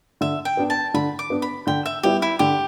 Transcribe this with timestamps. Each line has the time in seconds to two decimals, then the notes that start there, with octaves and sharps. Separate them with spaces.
0.21 D3 E5
0.45 G5
0.57 B3 D4
0.70 A5
0.94 D3 B5
1.19 D6
1.30 B3 D4
1.42 B5
1.67 D3 G5
1.86 E5
2.03 G3 B3 E4 G4
2.22 E4
2.39 D3 G4